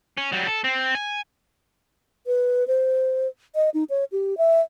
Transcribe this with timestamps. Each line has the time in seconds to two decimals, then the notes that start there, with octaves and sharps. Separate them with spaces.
0.17 C#4
0.32 F#3 G3
0.47 A4
0.64 C4
0.95 G#5
2.27 B4
2.67 C5
3.55 D#5
3.74 D#4
3.90 C#5
4.12 G4
4.38 E5